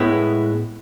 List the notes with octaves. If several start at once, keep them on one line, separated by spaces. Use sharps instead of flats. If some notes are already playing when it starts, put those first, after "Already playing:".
Already playing: A2 G#3 B3 E4